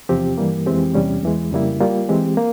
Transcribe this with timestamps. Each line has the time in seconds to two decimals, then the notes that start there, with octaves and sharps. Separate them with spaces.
0.09 E2 C3 F3 C4 G4
0.38 G2 E3 G3 A#3
0.66 F2 E3 G#3 C4 G4
0.94 E2 C3 G3 C#4
1.23 E2 E3 G#3
1.52 F2 C#3 G3 A#3 E4
1.81 G3 A#3 F4
2.09 E3 G#3 C4 G4
2.37 A#3